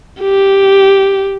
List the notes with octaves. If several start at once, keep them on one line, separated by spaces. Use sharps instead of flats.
G4